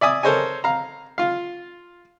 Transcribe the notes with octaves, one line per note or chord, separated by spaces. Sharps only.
D5 E5 G#5 D#6
A4 A#4 C5 C#5 D#5 G#5
F5 A#5
F4 F5